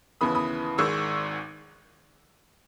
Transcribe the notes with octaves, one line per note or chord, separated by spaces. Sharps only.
D#2 C#3 E3 B3 B5 D#6
B5 D#6
G#1 G#2 D#3 G#3 C#6 E6